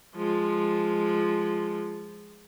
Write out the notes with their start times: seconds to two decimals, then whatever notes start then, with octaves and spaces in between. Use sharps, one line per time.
0.16 F3 G#3